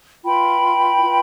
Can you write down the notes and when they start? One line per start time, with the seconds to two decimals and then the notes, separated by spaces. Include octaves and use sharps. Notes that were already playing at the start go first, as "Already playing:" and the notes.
0.24 F4 B4 G5 B5
1.00 F4 B4